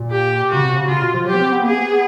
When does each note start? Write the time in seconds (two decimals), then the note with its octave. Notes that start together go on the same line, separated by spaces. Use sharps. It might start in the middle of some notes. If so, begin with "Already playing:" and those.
Already playing: A#2
0.11 G4
0.50 C#3 F#4
0.62 C3
0.75 C#3
0.88 C#3 F4
1.02 B2
1.14 F3
1.27 F#3 G4
1.35 B3
1.40 C4
1.52 B3
1.62 A#3 G#4
1.72 B3